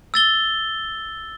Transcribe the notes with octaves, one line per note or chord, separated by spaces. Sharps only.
E6 A6 G7